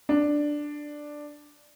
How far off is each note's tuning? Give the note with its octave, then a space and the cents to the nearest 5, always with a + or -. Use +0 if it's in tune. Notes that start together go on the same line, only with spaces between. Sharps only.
D4 +5